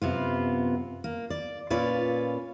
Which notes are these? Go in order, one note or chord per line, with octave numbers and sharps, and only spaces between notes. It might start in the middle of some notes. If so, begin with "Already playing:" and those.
F#2 C3 B3 F4
A#3
D5
A#2 C#4 F4 B4 C#5 D5